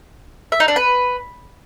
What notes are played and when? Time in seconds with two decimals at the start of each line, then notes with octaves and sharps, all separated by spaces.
0.52 E5
0.60 D#4
0.68 D4
0.76 B4